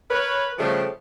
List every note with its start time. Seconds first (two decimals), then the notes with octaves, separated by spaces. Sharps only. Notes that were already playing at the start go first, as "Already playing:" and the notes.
0.11 A#4 B4 C#5
0.59 C#3 F3 G3 A3 D4 G4